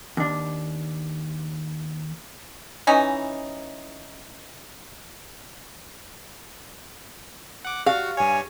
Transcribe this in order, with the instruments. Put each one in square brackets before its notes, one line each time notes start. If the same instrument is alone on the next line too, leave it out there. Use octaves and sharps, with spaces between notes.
[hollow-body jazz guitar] D#2 D4
[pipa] E3 C#4 D#4
[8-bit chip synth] F#5 D6
[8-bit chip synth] F#4 [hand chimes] G4 [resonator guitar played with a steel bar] F5
[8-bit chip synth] G2 C#5 [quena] G#5